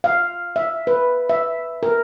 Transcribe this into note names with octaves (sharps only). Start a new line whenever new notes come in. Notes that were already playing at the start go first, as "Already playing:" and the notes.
F5
E5
B4
E5
A#4